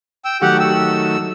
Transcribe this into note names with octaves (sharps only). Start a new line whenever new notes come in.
G5 E6
D#3 F#3 A3 G4 F#5
E6